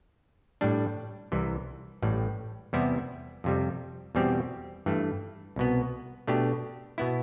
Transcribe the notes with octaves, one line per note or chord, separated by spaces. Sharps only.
A2 G3 D4
C2 C3 E3
A1 A2 G3
E2 C3 G3 B3 E4
F2 C3 G3
E2 B2 G3 C4 G4
G2 E3 A3
C2 B2 B3
B2 A3 D4 G4
B2 B3 E4